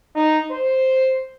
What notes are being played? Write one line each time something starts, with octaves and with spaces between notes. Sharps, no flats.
D#4
C5